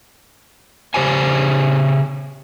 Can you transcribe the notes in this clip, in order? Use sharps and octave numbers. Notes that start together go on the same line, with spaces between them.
C#3 G4 C5 C#5 G#5